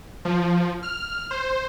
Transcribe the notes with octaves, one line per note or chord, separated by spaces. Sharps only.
F3
F6
C5